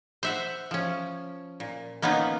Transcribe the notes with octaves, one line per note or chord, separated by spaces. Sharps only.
C5 E5 F#5
F3 C#4
A#2
A#3 B3 C#4 D#4 F4